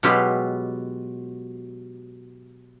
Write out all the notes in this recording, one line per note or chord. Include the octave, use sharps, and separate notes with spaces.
B2 F#3 G#3 F4 G4 B4